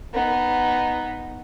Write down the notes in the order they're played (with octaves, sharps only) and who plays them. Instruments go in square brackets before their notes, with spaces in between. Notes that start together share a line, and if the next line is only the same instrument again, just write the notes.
[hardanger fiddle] B3 D#4